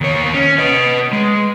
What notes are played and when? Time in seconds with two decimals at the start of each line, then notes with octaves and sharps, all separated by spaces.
0.01 D#2 C#5
0.34 C#4
0.58 B4 D#5
1.13 G#3